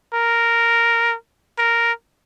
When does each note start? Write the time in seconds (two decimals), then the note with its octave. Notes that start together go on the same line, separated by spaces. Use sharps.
0.14 A#4
1.58 A#4